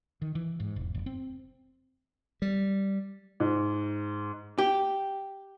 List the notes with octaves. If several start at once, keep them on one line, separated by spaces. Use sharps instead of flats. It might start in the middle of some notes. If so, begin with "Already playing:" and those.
D#3
E3
G#2
E1
F1
C4
G3
G#2
G4